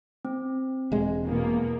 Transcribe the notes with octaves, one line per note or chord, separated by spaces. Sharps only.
C4
E1 G#3
E2 B2 A#3